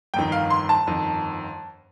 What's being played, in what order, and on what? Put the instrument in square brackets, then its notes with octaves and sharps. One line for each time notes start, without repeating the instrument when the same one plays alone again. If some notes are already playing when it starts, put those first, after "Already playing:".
[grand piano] G1 F2 D#3 G5
F5
C6
A5
G1 F2 D#3